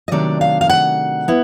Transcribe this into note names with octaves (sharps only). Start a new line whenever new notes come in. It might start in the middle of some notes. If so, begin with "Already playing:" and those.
D#5
C3 D#3 F#3 A3 D4 D5
F5
F5
F#5
B3 E4